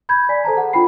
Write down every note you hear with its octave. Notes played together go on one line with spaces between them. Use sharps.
B5 G6 G#6
D5 G#5 B6
A4 C5 A5 A#5
G#4 F#5
D4 F4 A4 G5 B5 C7